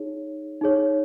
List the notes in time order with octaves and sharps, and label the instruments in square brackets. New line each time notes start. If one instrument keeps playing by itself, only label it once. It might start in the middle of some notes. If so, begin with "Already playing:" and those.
Already playing: [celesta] D#4 G#4 C#5
D#4 G#4 C#5